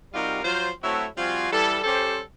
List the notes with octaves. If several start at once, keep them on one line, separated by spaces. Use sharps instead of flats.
C3 G3 D#4 F4 F#4 A#4
F3 F#3 F4 C5
F#3 A3 C4 E4 F#4 C#5
F3 G3 C4 F4 F#4 G#5
E3 G3 E4 A4
G3 C#4 G4 A4 C5